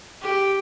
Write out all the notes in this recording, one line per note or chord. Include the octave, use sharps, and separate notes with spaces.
G4